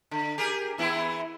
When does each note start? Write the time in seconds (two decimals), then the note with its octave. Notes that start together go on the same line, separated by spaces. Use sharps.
0.11 D3
0.38 G4 G#4 A#4
0.78 E3 B3 E4